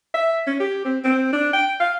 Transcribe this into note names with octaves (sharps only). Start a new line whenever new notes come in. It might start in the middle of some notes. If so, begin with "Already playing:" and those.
E5
C#4
G4
C4
C4
D4
G5
F5